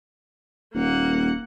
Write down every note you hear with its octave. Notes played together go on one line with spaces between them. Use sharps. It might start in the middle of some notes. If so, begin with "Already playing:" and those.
D#1 A#3 F#5